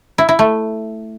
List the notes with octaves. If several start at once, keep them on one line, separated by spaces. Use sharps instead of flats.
E4
E4
A3